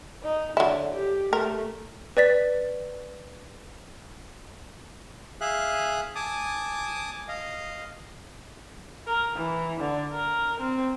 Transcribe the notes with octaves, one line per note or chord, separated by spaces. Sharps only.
D#4
D3 F#3 E4
G4
A3 A#4
B4 D5 A6 B6
G#4 E5 F5 F#6
G#5 A5 D6 D#6
D#5 F5
A#4
E3
D3
A#4
C4